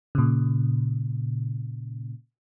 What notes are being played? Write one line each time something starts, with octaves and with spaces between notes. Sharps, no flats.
A#2 C#3